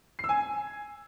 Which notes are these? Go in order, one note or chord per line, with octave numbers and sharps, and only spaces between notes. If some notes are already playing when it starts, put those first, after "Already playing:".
C7
E6
G#5